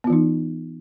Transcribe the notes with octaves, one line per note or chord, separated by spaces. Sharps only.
E3 B3 D#4 F4